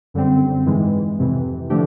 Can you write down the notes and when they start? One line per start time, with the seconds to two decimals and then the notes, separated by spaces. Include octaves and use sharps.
0.14 F#2 D3 G3 C4
0.66 G#2 E3 G#3
1.18 F2 C3 E3
1.70 D3 F3 A3 D4 G4